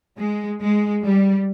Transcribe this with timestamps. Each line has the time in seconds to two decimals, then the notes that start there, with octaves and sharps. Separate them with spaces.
0.20 G#3
0.61 G#3
1.06 G3